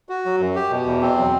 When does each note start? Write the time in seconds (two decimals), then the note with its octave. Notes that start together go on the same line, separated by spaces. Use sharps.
0.09 F#4
0.25 F#3
0.40 F#2
0.55 G4
0.71 B2
0.86 E2
1.02 C4
1.18 F#3